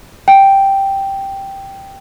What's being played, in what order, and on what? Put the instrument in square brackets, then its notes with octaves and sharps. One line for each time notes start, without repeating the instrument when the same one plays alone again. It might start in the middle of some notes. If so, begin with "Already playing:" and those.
[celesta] G5